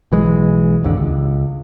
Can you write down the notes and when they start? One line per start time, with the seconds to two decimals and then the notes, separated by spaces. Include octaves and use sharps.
0.12 B1 E3 G#3
0.83 G#1 D#2 D3
0.97 C#2